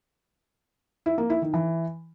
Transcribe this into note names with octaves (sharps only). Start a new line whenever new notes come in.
E4
A#3
E4
D#3
E3